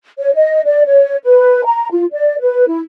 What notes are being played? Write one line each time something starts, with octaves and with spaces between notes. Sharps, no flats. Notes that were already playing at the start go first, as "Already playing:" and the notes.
C#5
D#5
D5
C#5
B4
A#5
F4
D5
B4
E4